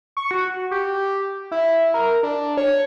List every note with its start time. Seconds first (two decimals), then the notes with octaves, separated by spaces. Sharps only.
0.17 C#6
0.31 F#4
0.71 G4
1.51 E4
1.94 A#4
2.23 D4
2.57 C#5